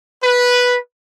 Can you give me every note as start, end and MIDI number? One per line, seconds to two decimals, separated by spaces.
0.23 0.76 71